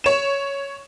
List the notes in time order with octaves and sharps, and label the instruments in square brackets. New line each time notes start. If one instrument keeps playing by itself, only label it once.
[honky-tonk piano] C#5 E7